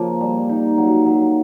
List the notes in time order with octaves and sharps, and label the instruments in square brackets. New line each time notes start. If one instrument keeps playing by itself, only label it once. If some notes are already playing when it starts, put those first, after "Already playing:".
Already playing: [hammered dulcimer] C#3 F3 A#3
G3
D#4
F#3
F#3